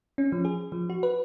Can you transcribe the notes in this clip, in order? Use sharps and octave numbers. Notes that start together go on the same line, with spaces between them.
C#4
F3
G#4
F3
F#4
B4